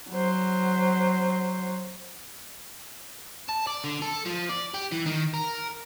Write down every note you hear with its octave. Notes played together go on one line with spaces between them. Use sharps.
F#3 C5
A5
D5
D3
A4
F3
D5
G4
E3
D#3
A#4